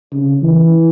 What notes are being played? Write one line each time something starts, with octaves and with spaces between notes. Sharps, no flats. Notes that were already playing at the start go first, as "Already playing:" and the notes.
C#3
E3